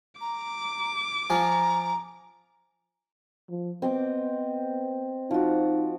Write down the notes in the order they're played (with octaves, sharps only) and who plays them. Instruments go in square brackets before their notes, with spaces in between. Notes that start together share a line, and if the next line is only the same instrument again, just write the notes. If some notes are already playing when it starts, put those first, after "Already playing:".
[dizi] A#5 [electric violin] D6
[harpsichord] F3 F4 [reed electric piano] G#5 [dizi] A#5
[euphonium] F3
[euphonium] B3 [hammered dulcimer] C4 D#5 D6
[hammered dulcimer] F3 F#4 [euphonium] D#4